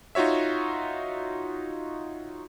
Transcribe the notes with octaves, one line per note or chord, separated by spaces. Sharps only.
D#4 F4 F#4 C#5 E5